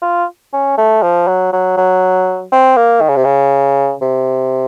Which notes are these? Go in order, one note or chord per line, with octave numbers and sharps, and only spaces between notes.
F4
C#4
A3
F3
F#3
F#3
F#3
C4
A#3
D#3
C#3
C3
C#3
C3